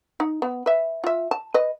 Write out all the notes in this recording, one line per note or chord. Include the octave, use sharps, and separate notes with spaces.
D#4
B3
B4 E5
F4 E5
A5
B4 D#5